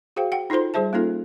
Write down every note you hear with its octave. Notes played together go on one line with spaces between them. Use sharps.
F#4 G#4 C5 F5 G5
F#5 G5
D#4 F4 A4 C5 C6
G3 G#4 C5 E5 A5
A#3 C#4 D#4 F4 A4